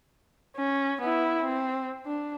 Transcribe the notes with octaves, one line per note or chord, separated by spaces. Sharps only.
C#4
B3 E4
C4
D4